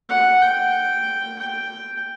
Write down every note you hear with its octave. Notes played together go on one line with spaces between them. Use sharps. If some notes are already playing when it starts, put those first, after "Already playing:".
F#5
G5
G5